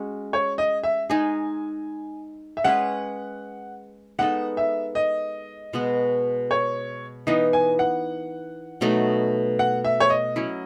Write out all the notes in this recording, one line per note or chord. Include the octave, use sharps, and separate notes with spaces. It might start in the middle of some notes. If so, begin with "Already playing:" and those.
Already playing: G#3 C#4 F#4
C#5
D#5
E5
G#3 D#4 G#4 G#5
E5
G#3 C#4 G#4 B4 F#5
G#3 B3 D#4 A4 F#5
E5
D#5
B2 G#3 B3 F#4
C#5
E3 B3 D#4 D#5
G#5
F#5
B2 F#3 A3 D#4
F#5
E5
C#5
D#5
F#3 C#4 E4